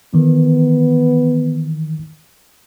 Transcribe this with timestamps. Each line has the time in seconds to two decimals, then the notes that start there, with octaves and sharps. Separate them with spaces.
0.14 D#3 E3 B3